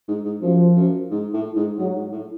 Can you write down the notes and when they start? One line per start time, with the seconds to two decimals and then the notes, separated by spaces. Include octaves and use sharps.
0.08 G#2
0.24 G#2
0.42 F#2 F3
0.76 F#2
1.11 G#2
1.33 A2
1.56 G#2
1.78 G#2 F#3
1.96 G#2
2.12 A2